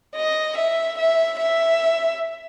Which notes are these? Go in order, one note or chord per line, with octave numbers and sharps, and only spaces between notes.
D#5
E5
E5
E5